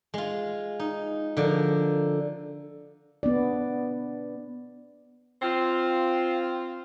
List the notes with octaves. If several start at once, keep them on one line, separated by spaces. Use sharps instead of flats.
G#3 F4
D#4
D3 F3 A#4
B3 D4 D5
C4 F4